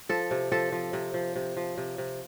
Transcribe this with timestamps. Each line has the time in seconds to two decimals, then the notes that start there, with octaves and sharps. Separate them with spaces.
0.09 F3 A4
0.31 C3
0.52 F3 A4
0.72 F3
0.93 C3
1.14 F3
1.36 C3
1.57 F3
1.78 C3
1.98 C3